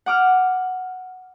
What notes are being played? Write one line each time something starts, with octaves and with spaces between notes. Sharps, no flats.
F#5 D6 F6